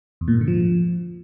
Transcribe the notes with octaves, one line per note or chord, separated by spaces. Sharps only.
E2
A#2
G#2
D3
F3